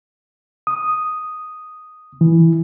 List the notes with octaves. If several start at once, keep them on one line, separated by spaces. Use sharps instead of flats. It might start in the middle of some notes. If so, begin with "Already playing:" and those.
D#6
E3